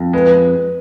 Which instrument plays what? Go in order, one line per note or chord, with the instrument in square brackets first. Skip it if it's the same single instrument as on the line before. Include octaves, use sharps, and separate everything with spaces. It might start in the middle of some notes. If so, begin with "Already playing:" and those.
Already playing: [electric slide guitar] F2
[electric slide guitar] G#3 [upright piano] B4